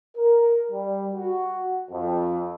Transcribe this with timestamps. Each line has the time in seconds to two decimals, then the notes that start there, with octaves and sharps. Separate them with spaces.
0.17 A#4
0.72 G3
1.14 F#4
1.91 F2